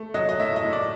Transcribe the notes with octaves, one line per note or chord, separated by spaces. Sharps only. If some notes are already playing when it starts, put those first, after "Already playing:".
Already playing: A3
F#3 D#5
D#5
A2 E5
D#5
A2
D5